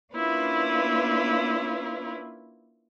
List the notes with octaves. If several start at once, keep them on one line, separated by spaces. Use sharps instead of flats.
A#3 C#4 D4 E4 F4 B4